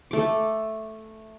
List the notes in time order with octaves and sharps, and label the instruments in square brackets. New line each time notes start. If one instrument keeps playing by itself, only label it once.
[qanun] A3 D6